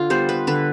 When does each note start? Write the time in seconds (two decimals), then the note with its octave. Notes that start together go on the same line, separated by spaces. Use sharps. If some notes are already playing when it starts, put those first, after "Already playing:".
Already playing: D3 F4
0.10 G3 B3 C5
0.29 B4
0.47 D3 B4